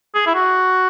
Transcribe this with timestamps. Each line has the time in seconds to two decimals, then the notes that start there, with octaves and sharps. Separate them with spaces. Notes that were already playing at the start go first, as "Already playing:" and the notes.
0.15 G#4
0.26 E4
0.34 F#4